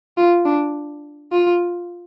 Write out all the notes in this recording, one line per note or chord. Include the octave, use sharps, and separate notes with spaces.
F4
D4
F4